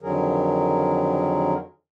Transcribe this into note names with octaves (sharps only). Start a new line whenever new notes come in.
F2 D3 D#3 F#3 G#4 A#4